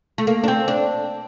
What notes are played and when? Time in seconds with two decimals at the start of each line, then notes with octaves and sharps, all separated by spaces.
0.18 A3
0.27 A#3
0.44 D4
0.48 C4
0.68 D4